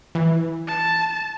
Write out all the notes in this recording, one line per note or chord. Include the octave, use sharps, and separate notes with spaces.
E3
A5